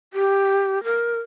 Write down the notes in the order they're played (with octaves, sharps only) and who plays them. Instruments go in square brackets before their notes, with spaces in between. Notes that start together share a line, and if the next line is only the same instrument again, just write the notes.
[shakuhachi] G4
A#4